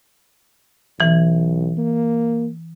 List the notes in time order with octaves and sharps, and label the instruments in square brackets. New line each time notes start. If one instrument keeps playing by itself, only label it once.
[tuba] B1 [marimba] E3 G#6
[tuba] A#3